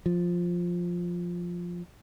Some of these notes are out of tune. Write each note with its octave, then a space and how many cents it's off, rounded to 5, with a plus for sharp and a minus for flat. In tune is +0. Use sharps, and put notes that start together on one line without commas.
F3 +5